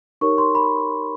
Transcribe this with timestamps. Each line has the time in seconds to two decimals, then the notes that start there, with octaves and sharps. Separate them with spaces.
0.21 D#4 G4 A#4 C#5 C#6
0.38 C6
0.55 B5